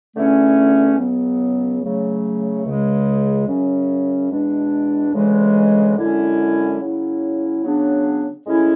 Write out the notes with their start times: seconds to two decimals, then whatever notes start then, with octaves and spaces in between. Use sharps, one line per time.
0.15 E2 D3 A3 C#4 E4
0.97 C#2 C#3 F#3 B3
1.80 C#3 F#3 A3
2.65 C#2 C#3 G#3
3.47 F#2 C#3 F#3 C#4
4.31 E2 B2 G#3 D4
5.13 D2 C#3 E3 G#3
5.96 F#2 D3 G#3 C#4 E4
6.79 C#3 F#3 C#4 E4
7.63 C#3 F#3 B3 D4
8.46 A2 G#3 C#4 E4